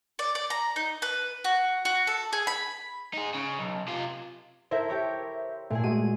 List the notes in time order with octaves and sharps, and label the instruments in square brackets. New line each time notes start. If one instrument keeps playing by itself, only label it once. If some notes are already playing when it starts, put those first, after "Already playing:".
[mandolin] D5
D5
A#5
D#4
B4
F#4
F#4
A4
G#4
B5
[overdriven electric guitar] D#4 G#4
C#3
B1
C3 F4
[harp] E4 A4 A#4 [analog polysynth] C5 E5
[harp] G4 A#4 C#5
[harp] A#2 E4 G#4 [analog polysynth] A3
[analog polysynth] G#3 A3 F#4 [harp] D#7